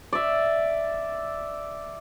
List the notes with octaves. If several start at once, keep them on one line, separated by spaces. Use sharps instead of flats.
D5 E5